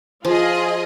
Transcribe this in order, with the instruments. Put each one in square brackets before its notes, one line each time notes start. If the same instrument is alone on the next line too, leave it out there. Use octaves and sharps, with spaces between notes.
[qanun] F3 [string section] F4 G#4 D#5